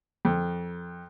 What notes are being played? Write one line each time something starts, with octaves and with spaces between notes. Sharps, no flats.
F2